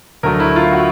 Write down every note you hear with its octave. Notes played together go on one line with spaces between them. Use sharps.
D2 D3 F#3 A3 A#4
E4
F4
F#4